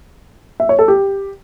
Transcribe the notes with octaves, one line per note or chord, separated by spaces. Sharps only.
E5
C#5
A4
G4